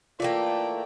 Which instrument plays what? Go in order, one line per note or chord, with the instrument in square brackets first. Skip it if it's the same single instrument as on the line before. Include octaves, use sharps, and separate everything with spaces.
[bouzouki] E3 A3 A#3 [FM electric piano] F4 [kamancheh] D5 G5